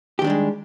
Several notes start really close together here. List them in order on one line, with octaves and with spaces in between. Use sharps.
G4 D#3 D4 G3 G#3